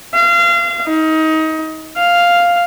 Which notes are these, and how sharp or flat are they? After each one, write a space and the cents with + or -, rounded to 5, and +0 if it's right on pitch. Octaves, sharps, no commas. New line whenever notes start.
F5 -30
D#4 +25
F5 +0